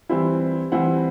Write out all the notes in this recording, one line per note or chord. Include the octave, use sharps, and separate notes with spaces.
E3 G3 C4 E4
E3 G3 C4 E4 F#5